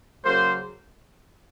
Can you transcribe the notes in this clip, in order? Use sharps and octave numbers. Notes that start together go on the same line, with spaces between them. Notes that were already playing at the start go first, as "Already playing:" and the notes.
C#3 F#3 A#3 C5